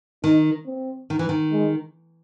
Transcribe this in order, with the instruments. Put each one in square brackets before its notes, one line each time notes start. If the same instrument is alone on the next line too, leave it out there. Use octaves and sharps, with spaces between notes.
[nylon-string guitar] D#3 [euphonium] D#4
[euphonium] C4
[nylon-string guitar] D#3
E3
D#3
[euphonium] G#3